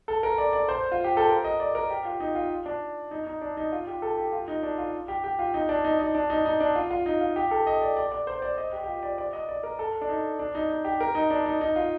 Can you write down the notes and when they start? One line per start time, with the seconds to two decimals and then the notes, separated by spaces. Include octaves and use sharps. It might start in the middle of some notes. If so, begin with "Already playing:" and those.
0.08 A4
0.23 A#4
0.38 D5
0.53 D5
0.68 C5
0.92 F4
1.04 G4
1.17 A4
1.29 A#4
1.44 D#5
1.60 D5
1.75 A#4
1.90 G4
2.05 F4
2.20 D#4
2.35 F4
2.66 D4
3.11 D#4
3.26 D#4
3.41 D4
3.57 D#4
3.72 F4
3.87 G4
4.02 A4
4.17 G4
4.33 F4
4.48 D#4
4.63 D4
4.78 F4
5.08 G4
5.24 G4
5.39 F4
5.54 D#4
5.69 D4
5.84 D#4
5.99 D#4
6.15 D4
6.30 D#4
6.45 D#4
6.60 D4
6.75 F4
6.91 F4
7.06 D#4
7.21 F4
7.36 G4
7.51 A4
7.67 D#5
7.82 D5
7.97 D5
8.12 D5
8.27 C5
8.42 D5
8.58 D#5
8.73 G4
8.83 G4
8.88 F4
9.03 D5
9.18 D5
9.33 D#5
9.49 D5
9.63 A#4
9.79 A4
10.01 D4
10.09 D#4
10.39 D4
10.55 D#4
10.70 D#4
10.85 G4
11.00 A#4
11.15 D#4
11.30 D4
11.46 D#4
11.61 D#4
11.76 F4